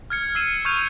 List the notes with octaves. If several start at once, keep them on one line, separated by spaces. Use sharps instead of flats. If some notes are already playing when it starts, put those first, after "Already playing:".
F6 G#6 C#7
E6 C7 D#7 E7
C#6 F6 G6 G#6 D#7 F7